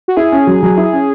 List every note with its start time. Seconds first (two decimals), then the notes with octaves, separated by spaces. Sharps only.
0.08 F#4
0.17 E4 G#4
0.32 C#4
0.47 F#3
0.63 F#3
0.77 E4
0.93 C#4